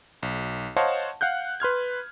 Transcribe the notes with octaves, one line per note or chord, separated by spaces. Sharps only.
B1
C5 C#5 D#5 F5 F#5 A5
F5 F#5 F#6 G6
B4 C6 F6 G#6